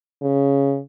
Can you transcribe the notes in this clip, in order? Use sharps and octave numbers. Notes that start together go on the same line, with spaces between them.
C#3